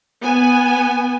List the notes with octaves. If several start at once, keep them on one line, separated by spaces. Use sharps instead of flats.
B3 G#5